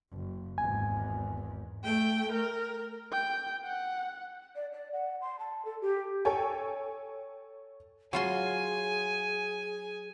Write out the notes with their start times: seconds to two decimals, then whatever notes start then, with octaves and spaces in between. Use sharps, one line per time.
0.11 F#1
0.58 G#1 E2 G#5
1.84 A3 G5
2.32 A#4
3.12 G5
3.64 F#5
4.56 D5
4.73 D5
4.93 F#5
5.21 C6
5.39 A5
5.65 A4
5.81 G4
6.25 A4 C#5 G5 G#5
8.13 F#3 F4 G#4 G#5 C6